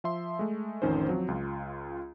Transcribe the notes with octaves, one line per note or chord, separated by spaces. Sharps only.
F3 E5 C6
G#3 A3
A1 F2 D#3 C#4 D#4 C5
F3 F#3 C4
C#2 F4